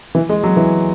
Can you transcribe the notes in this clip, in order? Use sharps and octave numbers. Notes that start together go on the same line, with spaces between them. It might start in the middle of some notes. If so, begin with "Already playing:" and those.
E3
G#3
F#3
E3